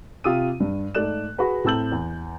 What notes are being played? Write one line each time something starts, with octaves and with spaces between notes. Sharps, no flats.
C3 F4 G4 D#6 E6 D#7
G2
G#2 A3 D5 F#6 E7
F#4 G#4 B4 F#5
A2 C4 A5 E6 G6 F#7
E2